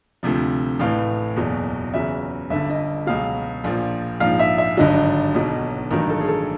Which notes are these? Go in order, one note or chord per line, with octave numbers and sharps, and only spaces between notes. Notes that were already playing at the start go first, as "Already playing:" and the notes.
D2 C3 F3
A1 A2 E3 F5
F#1 E2 B2 F#3
E2 C#3 F#3 E5
G1 G2 D3 E5
D#5
C#2 B2 F#3 F5
A#1 A#2 F3
A#1 G#2 F3 F5
E5
E5
G#1 G2 D3 F#3 D#5
B1 B2 F#3
A1 G2 D#3 F#3 A#4
A4
G#4
A4